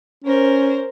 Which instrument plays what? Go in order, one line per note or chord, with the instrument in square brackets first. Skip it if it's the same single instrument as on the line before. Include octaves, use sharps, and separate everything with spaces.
[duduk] C#4 [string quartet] A#4 C5